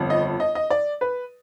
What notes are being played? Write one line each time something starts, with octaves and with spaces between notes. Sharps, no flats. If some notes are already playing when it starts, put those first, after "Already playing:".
Already playing: G1 F2
D#5
D#5
D#5
D5
B4